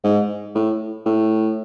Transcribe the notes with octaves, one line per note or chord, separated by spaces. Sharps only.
G#2
A2
A2